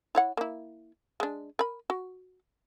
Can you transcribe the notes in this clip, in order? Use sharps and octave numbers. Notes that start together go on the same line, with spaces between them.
E4 C#5 F#5
A#3 E4
G#3 D4
A#4 B5
F#4